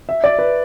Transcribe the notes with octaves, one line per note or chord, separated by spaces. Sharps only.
E5
D5
B4